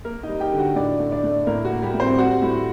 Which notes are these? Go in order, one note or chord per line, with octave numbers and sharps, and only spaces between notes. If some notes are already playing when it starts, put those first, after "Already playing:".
A#3 A#4
G3 D#4 D#5
G4 G5
D3
F#4 F#5
A2 D4 D5
A3
D4 D5
A3
A2 A#3 A#4
F#4
A#3
G3 G4
A2
C4 C5
G3 F#4 F#5
A2